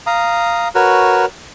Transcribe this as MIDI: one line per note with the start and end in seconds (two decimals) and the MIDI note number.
0.07 0.68 77
0.07 0.68 82
0.07 0.68 87
0.75 1.26 66
0.75 1.26 70
0.75 1.26 71
0.75 1.26 73